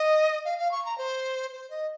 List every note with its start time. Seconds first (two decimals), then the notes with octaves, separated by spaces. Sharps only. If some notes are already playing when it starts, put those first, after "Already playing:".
Already playing: D#5
0.45 F5
0.58 F5
0.71 C#6
0.85 A#5
0.98 C5
1.53 C5
1.70 D#5